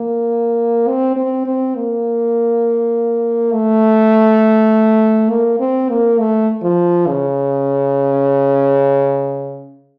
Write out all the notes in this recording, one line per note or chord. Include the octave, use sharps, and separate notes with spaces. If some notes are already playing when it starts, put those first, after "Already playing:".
Already playing: A#3
C4
C4
C4
A#3
A3
A#3
C4
A#3
A3
F3
C#3